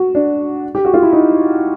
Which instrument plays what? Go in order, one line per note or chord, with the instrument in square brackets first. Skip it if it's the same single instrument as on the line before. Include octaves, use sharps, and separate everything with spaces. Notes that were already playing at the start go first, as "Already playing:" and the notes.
Already playing: [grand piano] F#4
D4
G4
F#4
F4
E4
D#4